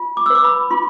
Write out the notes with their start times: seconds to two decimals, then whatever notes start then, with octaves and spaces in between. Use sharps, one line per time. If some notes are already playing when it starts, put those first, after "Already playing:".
Already playing: F4
0.17 D6
0.26 E6
0.30 B4 D6
0.44 B5
0.70 F4 C6